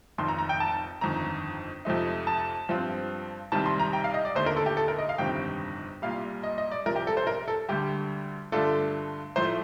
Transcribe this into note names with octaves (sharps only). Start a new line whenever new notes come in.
F1 F2 D#3 C6
A#5
A#5
G5
A5
G1 F2 D#3 A#5
F2 C3 F3 A3 D#4
A5
G2 F3 C4 F4
C2 C3 D#3 G3 A5
C6
A#5
G5
F5
D#5
D5
D#2 D3 A3 D#4 C5
A#4
A4
G4
A4
A#4
D#5
F5
G1 F2 C3 D#3 G3 G5
C2 A#2 G3 F5
D#5
D#5
D5
C2 C3 F3 A#4
G4
A4
C5
A#4
A4
D2 D3 G3 G4
G2 D3 A3 D4 F4 A4
A2 F3 A3 C5